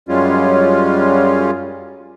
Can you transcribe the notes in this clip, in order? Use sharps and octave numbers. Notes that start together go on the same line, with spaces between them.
F#2 G3 G#3 C#4 F4